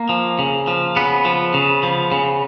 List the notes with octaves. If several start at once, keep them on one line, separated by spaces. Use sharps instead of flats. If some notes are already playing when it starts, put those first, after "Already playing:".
Already playing: A#3
F3
C#3
F3
C#3 B3
F3
C#3
F3
C#3